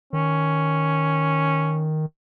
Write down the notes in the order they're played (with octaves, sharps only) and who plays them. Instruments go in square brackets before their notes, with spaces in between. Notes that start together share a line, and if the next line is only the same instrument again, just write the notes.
[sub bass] D#3 [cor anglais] C#4